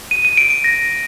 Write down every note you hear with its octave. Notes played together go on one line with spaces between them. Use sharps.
D#7
D#7
D7
D7
A#6